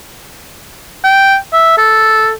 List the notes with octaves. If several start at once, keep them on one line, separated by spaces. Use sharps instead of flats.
G5
E5
A4